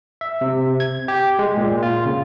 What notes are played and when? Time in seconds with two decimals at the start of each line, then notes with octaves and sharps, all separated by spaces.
0.21 E5
0.41 C3
0.80 G#6
1.08 G4
1.39 G#3
1.57 A#2
1.83 F4
2.05 C#3